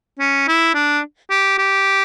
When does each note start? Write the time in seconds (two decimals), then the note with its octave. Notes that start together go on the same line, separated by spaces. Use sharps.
0.19 C#4
0.48 E4
0.75 D4
1.30 G4
1.58 G4